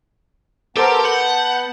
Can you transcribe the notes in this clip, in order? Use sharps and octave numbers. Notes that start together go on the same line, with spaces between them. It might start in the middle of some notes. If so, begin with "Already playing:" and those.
B3 G4 A4 A#4 C5 A5
F#5 G6